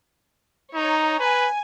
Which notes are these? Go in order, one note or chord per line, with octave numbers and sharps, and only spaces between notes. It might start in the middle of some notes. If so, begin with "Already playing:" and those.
D#4 C#5 A#5
B4 G#5